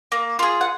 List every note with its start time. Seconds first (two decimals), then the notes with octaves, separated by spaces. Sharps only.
0.12 A#3
0.39 F4 G#4
0.61 F#5